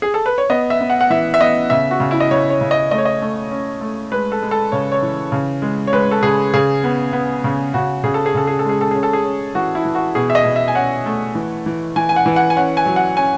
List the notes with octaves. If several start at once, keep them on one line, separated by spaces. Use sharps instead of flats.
G#4
A4
B4
C#5
B3 D#5
E5
B3
F#5
F#5
E3 E5
E5
B3 D#5
C#3 E5
F#4
C#3
E4
D#5
C#3 C#5
C#5
C#3
D#5
A3 D#5
C#5
D#5
A3
C#4
A3
G#3 B4
A4
G#3
A4
C#3 C#5
C#5
E3
C#3
G#3
C#5
G#3 B4
A4
C#3 G#4
C#3 G#4
B3
B3
C#3
C#3 F#4
C#3 G#4
A4
G#4
C#3 A4
G#4
A4
G#3 G#4
A4
C#4 G#4
A4
G#4
C#4
E3 F#4
E4
E3
F#4
B2 G#4
E5
D#5
B2
E5
G#5
C#4 F#5
A3
E3
E3
E3 G#5
G#5
F#5
E3
F#5
G#5
C#4 F#5
G#5
F#3
F#5
C#4 G#5